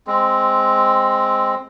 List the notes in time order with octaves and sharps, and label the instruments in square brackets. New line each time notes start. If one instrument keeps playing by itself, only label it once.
[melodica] G#3 C4